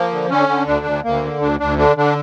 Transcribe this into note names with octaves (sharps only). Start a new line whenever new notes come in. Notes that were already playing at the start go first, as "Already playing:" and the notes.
Already playing: F3 A#3
D3
D3 C#4
D3
D2 D4
D2
D2 A#3
D3
D2 D4
D2 D4
D3 D4
D3 D4